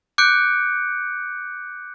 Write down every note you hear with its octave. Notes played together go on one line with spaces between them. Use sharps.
D6 F#6 G6 C#7 D7